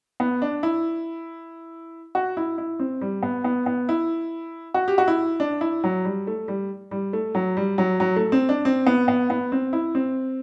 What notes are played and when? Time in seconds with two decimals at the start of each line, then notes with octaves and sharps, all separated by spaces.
0.20 B3
0.42 D4
0.63 E4
2.15 F#4
2.37 E4
2.58 E4
2.79 C4
3.01 G3
3.23 B3
3.44 B3
3.66 B3
3.89 E4
4.74 F#4
4.88 G4
4.98 F#4
5.08 E4
5.40 D4
5.61 E4
5.84 F#3
6.05 G3
6.27 A3
6.48 G3
6.91 G3
7.13 A3
7.35 F#3
7.57 G3
7.78 F#3
8.00 F#3
8.16 A3
8.32 C4
8.49 D4
8.65 C4
8.87 B3
9.08 B3
9.30 B3
9.52 C4
9.73 E4
9.95 C4